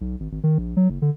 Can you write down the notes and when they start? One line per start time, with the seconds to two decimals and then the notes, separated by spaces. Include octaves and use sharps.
0.01 B1
0.20 G#1
0.32 G#1
0.43 D#3
0.58 A#1
0.77 F#3
0.90 F#1
1.02 D3